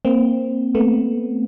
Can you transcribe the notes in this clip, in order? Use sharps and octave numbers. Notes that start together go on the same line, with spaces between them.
A#3 C4
A3 B3